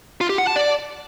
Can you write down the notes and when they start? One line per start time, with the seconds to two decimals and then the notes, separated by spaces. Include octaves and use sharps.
0.21 F4
0.30 G4
0.38 F#5
0.47 A5
0.56 D5